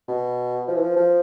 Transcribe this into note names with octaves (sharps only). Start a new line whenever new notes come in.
B2
F3
E3
F3
F3